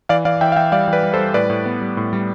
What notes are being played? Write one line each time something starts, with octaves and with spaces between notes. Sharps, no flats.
E3 D5 F5
E3 D5 F5
E3 E5 G5
F5
E3 E5 G5
G3 D5 F5
E3
B4 D5
G3
A4 C5
G3
A2 B4 D5
A2
B3
G3
A2
G3